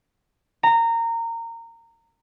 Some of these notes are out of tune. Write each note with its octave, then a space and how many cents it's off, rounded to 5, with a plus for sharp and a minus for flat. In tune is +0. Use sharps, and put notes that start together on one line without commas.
A#5 -20